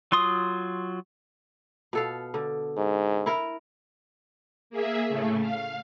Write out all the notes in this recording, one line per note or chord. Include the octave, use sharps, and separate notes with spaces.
F#3 F4 C6 D#6
B2 A4 F5
D3
G#2
E4 A#4
A#3 G#4 E5
A2 C#3 A3
F5